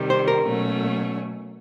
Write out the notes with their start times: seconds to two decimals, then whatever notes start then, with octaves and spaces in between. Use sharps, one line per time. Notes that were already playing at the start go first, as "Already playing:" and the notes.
Already playing: C3 D#3 G3
0.10 C5
0.28 A#4
0.46 B2 F#3 A3 C#4